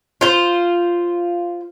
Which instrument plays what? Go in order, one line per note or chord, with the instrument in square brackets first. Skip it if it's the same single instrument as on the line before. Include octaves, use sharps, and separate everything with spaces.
[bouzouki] F4 C5